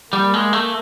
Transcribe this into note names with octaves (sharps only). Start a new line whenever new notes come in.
G3 A#3
G#3
A3